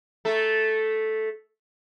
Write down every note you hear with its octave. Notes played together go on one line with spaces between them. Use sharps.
A3 A4